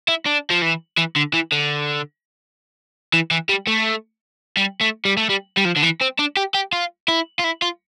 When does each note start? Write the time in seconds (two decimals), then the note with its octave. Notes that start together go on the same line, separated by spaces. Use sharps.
0.08 E4
0.26 D4
0.51 F3
0.62 E3
0.98 E3
1.16 D3
1.33 E3
1.52 D3
3.13 E3
3.31 E3
3.49 G3
3.67 A3
4.57 G3
4.81 A3
5.05 G3
5.17 A3
5.29 G3
5.57 G3
5.65 F3
5.76 D3
5.83 E3
6.01 C4
6.19 D4
6.37 G4
6.54 G4
6.73 F4
7.08 E4
7.39 F4
7.44 E4
7.62 F4